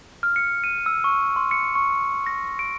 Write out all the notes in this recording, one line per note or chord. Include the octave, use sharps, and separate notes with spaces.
F6
C#7
D#7
E6
C#6
C6
C#7
C#6
A#6
D7